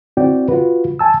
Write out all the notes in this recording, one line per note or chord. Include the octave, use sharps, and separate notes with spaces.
C4 E4 F#4 D5 G5
F4 F#4 B4
G#5 A5 E6